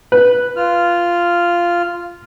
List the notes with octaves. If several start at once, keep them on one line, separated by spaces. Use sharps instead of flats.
B4
F4 F6